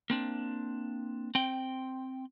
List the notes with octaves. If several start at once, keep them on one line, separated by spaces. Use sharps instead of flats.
A#3 C4 D4
C4 G5